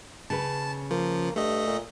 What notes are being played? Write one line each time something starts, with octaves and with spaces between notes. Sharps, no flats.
C#3 B4 A5
F3 A#3
G2 A3 D#5
A#2